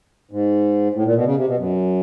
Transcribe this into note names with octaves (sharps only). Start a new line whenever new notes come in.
G#2
A2
A#2
B2
C#3
C3
B2
F#2